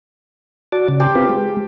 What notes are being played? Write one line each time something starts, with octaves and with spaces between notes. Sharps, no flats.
F#4 D5 A5
C#3
G4 A5 C6
C4 F4 B4
G#3